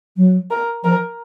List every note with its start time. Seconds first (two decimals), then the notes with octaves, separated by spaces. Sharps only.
0.17 F#3
0.51 A#4
0.83 F3 A#4